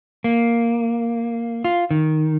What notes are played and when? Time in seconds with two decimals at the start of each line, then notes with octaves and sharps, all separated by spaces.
0.24 A#3
1.64 F4
1.91 D#3